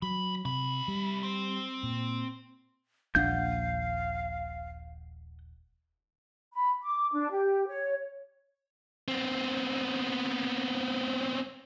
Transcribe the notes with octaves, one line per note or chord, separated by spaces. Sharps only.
D#2 F#3 B5
C2 C3 B5
G3
C4 C5
A#2
D#1 A#1 D4 F5 F#5 G6
B5
D6
D4
G4
C#5
B3 C4